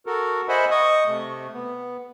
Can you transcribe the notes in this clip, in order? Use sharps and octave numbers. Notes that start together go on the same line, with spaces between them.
F#4 A4 A#4
C5 D#5 E5 F#5 G#5 B5
D#5 C#6 D#6
C3 A3
B3